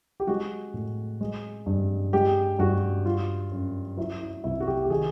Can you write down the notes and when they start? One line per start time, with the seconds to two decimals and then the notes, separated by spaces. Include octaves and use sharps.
0.20 G4
0.27 G#3 F#4
0.74 A2
1.21 G#3
1.66 G2
2.13 G#3 G4
2.59 G2 F#4
3.05 G3 F4
3.51 F#2
3.97 F#3 E4
4.20 E4
4.44 C2 E4
4.60 F#4
4.67 G4
4.84 G4
4.90 D#3 G#4